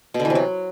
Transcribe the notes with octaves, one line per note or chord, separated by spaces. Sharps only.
B2
D3
E3
C3
F#3